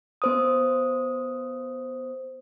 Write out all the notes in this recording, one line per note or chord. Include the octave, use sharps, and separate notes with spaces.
B3 C5 D#6